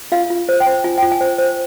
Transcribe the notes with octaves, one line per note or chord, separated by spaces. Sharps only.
F4 F5
F4
C5
G5
C5
F4 G#5
F4 G5
G#5
C5
C5